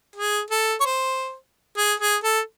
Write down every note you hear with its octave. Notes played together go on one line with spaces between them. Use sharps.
G#4
A4
C#5
C5
G#4
G#4
A4